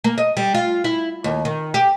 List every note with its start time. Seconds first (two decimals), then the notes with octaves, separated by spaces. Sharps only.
0.04 A#3
0.18 D#5
0.37 G3
0.55 F4
0.84 E4
1.24 D#2
1.45 D#3
1.74 G4